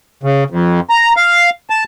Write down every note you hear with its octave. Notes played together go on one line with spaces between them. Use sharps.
C#3
F2
A#5
F5
A5